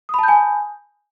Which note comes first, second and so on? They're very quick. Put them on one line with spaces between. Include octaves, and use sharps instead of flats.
D#6 B5 A5 G6 G#5